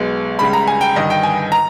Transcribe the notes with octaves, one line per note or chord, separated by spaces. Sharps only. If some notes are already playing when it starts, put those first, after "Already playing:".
Already playing: B1 B2 G#3
C#2 C#3 G3 B5
A#5
G#5
G5
G1 G2 D#3 D#5
G5
G#5
A#5